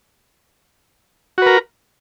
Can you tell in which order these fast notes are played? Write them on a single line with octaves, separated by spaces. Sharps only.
F#4 B4 A#4